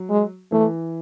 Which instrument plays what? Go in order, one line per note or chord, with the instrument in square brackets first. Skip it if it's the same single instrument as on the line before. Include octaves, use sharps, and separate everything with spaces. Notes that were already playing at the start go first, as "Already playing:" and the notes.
Already playing: [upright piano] F#3
[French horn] G#3
[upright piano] E3 [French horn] A3